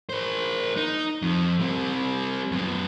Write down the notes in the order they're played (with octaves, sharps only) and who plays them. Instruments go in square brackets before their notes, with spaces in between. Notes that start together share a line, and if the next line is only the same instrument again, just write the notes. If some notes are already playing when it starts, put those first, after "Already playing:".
[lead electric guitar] A#4 C5
D#4
F2
G3 C4
F#2 B3